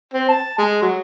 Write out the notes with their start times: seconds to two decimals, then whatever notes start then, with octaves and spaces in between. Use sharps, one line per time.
0.14 C4
0.28 A5
0.58 G#3
0.82 F#3